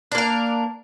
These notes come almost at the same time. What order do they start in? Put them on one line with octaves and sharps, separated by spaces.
D4 A#3 A#4